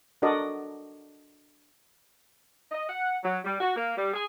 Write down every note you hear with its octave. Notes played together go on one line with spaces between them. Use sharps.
D4 F#4 A4 A#4 D5 D#5
D#5
F#5
F#3
G3
F#4
A#3
G3
G#4